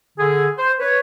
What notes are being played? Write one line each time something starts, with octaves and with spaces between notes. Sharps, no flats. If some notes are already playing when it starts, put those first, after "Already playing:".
D3 G#4
C5
B4 C#5